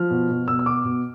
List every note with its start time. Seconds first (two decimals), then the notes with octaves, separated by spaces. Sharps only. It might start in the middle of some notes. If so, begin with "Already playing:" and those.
Already playing: F3 F6
0.11 B2
0.30 B2
0.48 B2 E6
0.59 E6
0.66 B2 D6
0.85 B2